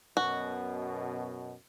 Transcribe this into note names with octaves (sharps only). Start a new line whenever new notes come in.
F#2 B2 F#4